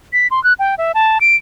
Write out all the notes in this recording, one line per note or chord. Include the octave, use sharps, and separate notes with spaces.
B6
C6
F#6
G5
E5
A5
D7